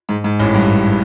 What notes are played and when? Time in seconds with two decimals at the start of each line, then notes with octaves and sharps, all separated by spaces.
0.09 G#2
0.24 G#2
0.39 A1 A2
0.54 G2